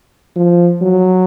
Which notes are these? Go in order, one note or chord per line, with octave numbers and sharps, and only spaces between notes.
F3
F#3